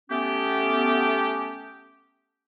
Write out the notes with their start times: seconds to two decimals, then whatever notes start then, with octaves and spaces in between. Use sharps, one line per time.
0.10 A3 B3 C#4 G4